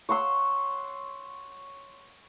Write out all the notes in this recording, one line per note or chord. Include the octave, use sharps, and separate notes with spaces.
C#5 F#5 C6 E6